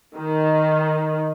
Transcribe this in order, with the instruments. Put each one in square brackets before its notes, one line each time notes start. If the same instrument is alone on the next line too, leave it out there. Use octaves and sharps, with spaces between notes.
[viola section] D#3